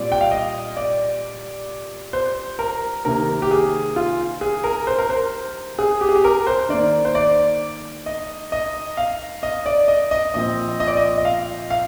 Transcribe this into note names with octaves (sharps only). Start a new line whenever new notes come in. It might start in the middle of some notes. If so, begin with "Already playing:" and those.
Already playing: A#2 G3 C4 D5
G5
F5
D#5
D5
C5
A#4
C3 D#3 A#3 A#4
G4
G#4
F4
G#4
A#4
C5
A#4
C5
G#4
G4
G#4
G4
A#4
C5
D#3 A#3 D5
C5
D5
D#5
D#5
F5
D#5
D5
D#5
D#5
A#2 F3 C4 D#5
D#5
D5
D#5
D#5
F5
F5